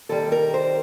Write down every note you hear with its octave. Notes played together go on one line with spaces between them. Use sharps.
D#2 D#3 G3 A4
A#4
C5